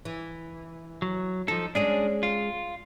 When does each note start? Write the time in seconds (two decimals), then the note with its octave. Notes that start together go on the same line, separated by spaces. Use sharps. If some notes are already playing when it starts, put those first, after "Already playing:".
0.05 E3
1.02 F#3
1.48 F3 D#4 A4
1.75 G#3 C#4 D4 G#4 D5
2.23 F4